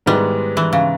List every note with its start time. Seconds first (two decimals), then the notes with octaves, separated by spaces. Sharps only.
0.06 G#2 D#3 G3 G#3 B3 E4
0.57 E3
0.73 C#3